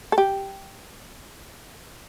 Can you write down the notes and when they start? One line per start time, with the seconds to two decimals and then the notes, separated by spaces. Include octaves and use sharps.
0.12 A4
0.18 G4